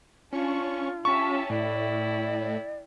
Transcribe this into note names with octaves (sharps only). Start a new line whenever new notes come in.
C#4 D4 F4 C#6
C#4 G4 E5 A5 C#6
A2 E4 D5 G5